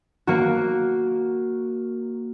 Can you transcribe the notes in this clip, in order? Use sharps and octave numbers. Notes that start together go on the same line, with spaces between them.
A#3 F#4